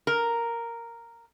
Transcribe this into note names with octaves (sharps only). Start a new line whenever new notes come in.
A#4